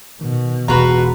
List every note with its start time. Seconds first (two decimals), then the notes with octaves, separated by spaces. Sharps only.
0.21 B2 D#3
0.68 E1 F4 F#4 B4 A#5